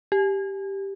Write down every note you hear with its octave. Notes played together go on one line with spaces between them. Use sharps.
G4